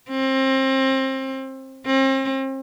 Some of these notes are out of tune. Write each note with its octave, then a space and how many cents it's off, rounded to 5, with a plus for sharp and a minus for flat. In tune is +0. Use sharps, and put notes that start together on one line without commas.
C4 +30
C4 +40